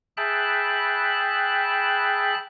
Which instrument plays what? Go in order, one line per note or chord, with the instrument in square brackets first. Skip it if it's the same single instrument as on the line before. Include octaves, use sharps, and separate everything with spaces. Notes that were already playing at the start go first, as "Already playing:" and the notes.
[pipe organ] G#4 E5 G5 A5 B5 F#6